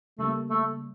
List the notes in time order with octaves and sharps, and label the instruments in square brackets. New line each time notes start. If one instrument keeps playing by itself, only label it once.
[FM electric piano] C#3 G3 A#3 [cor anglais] A3
[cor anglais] A3